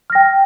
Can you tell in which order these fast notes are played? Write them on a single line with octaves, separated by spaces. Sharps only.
F6 A#6 G5